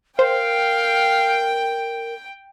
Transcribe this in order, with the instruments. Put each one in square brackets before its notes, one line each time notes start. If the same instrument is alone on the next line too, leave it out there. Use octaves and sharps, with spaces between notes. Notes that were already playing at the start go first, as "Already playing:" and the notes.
[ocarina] A#4 [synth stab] C5 [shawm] F5 [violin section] G5